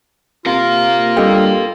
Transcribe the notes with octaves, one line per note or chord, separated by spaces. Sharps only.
C3 F4 A#4 F5
G2 G4 A4 D#5